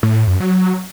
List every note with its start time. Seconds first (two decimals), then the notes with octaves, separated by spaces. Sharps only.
0.03 A2
0.27 F#2
0.40 F#3